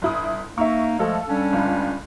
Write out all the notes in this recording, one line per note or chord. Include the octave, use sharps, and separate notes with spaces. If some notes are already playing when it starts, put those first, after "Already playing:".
G1 E4 D#6
A#3 D#4 E5 C#6
F3 G#3 A3 A4 F5
G3 C#4 D4
G1 C#2 F5